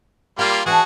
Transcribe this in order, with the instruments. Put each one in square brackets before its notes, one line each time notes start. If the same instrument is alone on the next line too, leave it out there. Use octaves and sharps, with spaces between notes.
[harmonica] G3 A#3 F4 [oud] F5
[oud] E3 D4 [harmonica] F#4 G#4